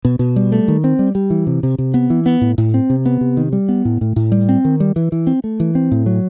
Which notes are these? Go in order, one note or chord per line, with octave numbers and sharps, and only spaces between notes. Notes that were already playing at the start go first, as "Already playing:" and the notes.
B2
B2
G3
A3
D#3
C4
G3
G3
E3
C3
C3
C3
B3
E3
B3
A2
A2
C4
C3
B3
C3
D#3
G3
B3
A2
A2
A2
G3
C4
D#3
G3
E3
E3
C4
A3
E3
C4
A2
F#3